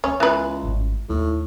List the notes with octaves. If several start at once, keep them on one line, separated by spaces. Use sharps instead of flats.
D#3 B3 C#4
C#2 E3 B4
G#1 G2
D#2 A2